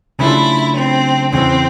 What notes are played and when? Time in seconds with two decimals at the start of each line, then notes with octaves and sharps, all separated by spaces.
0.20 C#3 F#3 A3 D4 E4 F4
0.77 C4
1.32 E2 C#3 E3 C4